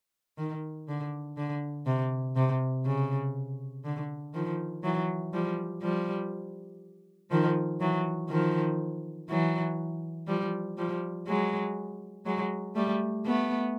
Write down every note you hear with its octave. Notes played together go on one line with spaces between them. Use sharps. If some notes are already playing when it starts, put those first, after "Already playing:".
D#3
D3
D3
C3
C3
C#3
D3
D#3 F3
E3 F#3
F3 G3
F3 G3
D#3 F3
E3 F#3
D#3 F3
E3 F#3
F3 G3
F3 G3
F#3 G#3
F#3 G#3
G3 A3
A3 B3